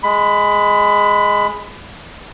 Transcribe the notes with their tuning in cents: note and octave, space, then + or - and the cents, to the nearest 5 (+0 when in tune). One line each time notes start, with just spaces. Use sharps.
G#3 +0 B5 +15